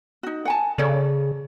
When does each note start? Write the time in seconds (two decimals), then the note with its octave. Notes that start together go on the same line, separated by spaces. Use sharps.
0.23 D#4 F#4
0.45 F#5 G#5 A5
0.78 C#3 A4 C#5 D5